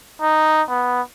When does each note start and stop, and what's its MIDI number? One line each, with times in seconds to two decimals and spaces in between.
0.21 0.62 63
0.69 1.02 59